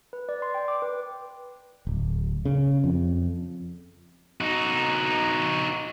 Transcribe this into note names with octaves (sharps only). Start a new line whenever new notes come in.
B4
D5
C6
G5
D6
B4
D1
C#3
F2
D#4 F#4